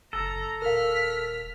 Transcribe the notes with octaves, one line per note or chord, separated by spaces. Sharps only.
F#1 A4 A#5
D#1 A#4 F5 F6 B6